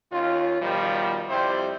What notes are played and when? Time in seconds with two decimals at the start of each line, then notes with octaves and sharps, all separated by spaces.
0.12 D#2 C#4 F4
0.62 B2 D#3 F3 G3
1.30 F2 G3 E4 G4 C5